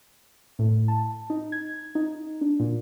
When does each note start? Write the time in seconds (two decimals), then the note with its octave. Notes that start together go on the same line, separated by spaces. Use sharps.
0.59 A2
0.88 A5
1.30 D#4
1.52 G#6
1.95 D#4
2.41 D4
2.60 A#2